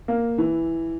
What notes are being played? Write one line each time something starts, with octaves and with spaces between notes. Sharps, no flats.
A#3
E3